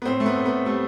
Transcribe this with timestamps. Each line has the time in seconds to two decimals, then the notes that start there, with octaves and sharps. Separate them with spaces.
0.02 B3
0.05 A2 C4
0.20 A3
0.26 B3
0.36 A2
0.46 B3
0.65 G3 A3